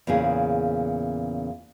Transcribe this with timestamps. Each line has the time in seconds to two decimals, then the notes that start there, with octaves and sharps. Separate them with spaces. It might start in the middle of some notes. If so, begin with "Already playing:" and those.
0.07 E2 A#2 C#3 G#4